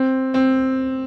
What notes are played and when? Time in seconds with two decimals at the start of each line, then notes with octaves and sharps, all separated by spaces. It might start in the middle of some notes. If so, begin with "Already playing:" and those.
Already playing: C4
0.34 C4